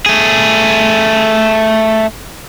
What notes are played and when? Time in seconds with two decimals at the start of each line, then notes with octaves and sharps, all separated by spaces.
0.06 A3 G#4